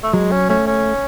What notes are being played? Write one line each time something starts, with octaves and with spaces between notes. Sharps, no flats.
A3
F#3 G#3
C#4
A3 C#4
C#4